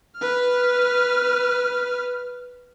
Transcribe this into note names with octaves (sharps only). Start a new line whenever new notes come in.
B4 F6